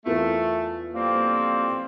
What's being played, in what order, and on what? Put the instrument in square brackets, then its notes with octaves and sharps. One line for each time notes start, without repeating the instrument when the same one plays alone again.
[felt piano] E2 F4 A#4 [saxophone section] A3
[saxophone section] F2 G3 C4 [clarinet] A#3